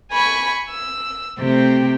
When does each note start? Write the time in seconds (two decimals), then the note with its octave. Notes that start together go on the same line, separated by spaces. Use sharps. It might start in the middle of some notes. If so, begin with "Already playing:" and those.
0.11 G#5 B5 C#6
0.69 E6
1.40 C3 A3 C4 G4